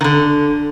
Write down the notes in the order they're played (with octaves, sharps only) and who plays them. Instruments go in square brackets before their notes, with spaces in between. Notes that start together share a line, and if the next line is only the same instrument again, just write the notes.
[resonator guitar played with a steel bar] D#3
D3